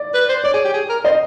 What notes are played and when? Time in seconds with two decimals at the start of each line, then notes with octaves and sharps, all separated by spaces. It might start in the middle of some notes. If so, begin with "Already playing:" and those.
Already playing: D5
0.14 B4
0.29 C5
0.44 C#5 D5
0.53 G#4
0.64 G4
0.73 G#4
0.89 A#4
1.04 C5 D#5